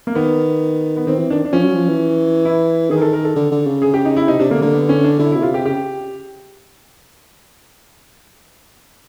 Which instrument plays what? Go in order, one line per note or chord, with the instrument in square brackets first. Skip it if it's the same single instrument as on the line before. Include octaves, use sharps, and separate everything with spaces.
[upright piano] A#3
[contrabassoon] D#3 [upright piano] B3
[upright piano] B3
[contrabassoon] D#3 [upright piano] C4
[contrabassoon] E3
[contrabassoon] D#3 [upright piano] D4
[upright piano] D4
[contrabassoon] F3 [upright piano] C#4
[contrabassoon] F#3
F3
E3
[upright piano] E4
[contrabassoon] D#3 [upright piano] G#4
[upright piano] A#4
A4
A#4
A4
[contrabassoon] D3
D3
C#3
[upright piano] G#4
G4
D#4
E4
[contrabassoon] C3 [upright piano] D#4
[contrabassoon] C3 [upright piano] D4
[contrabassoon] D3 [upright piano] A#3
[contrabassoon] D3 [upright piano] A#3
[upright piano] B3
C#4
D4
[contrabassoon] D3 [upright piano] E4
[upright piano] E4
[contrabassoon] B2
[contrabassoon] C3 [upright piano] F4
[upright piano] G4
[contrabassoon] C#3 [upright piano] G4